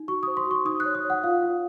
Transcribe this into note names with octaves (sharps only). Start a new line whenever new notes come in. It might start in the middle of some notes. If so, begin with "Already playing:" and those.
Already playing: D#4
F#4 C#6
C5 D#6
C6
F#4 C#6
D#4 D#6
F#6
C#5
D#6
C#5
F#5
F4 F5
F4